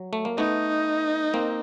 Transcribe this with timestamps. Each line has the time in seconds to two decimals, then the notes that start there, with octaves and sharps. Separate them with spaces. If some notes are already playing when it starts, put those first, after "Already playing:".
Already playing: F#3
0.13 A3
0.25 A#3
0.38 A3 B3 D#4
1.34 A#3 C4